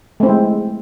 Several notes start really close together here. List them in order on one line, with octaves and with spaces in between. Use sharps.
A3 C4 E4 G#3